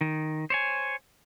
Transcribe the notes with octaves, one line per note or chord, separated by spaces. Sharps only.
D#3
C5 C#5 G#5